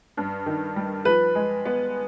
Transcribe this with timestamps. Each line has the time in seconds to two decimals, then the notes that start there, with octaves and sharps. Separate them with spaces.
0.17 G2
0.46 D#3
0.76 G3
1.05 F3 B4
1.35 G#3
1.66 B3